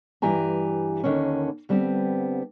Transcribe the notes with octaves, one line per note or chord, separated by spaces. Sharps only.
G2 E3 G4 G#5 A#5
D#2 D3 A#3 C#4
D3 G3 B3 C4